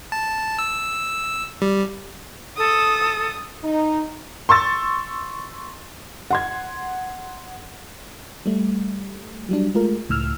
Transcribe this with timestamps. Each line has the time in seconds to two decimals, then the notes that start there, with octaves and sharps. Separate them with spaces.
0.12 A5
0.59 E6
1.62 G3
2.58 A4 D#6
3.64 D#4
4.49 C6 C#6 E6 A6
6.30 F#5 C6 G#6
8.46 G3 A3
9.49 F#3 G3 D4
9.74 G#3 A3 F4 A#4
10.09 C#2 A2 E6 F6